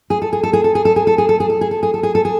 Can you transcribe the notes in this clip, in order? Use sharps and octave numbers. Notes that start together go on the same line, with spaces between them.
G#4
A4
G#4
A4
G#4
A4
G#4
A4
G#4
A4
G#4
A4
G#4
A4
G#4
A4
G#4
A4
G#4
A4
G#4